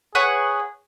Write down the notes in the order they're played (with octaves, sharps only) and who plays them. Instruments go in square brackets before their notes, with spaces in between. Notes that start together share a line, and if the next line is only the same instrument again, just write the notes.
[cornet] G#4 [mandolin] B4 C#5 F#5